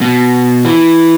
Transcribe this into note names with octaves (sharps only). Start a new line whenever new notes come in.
B2
E3